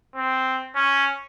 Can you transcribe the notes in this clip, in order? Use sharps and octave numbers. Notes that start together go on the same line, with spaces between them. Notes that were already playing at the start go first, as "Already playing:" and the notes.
C4
C#4